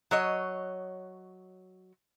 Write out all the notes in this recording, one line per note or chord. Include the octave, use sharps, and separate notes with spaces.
F#3 C#5 D#5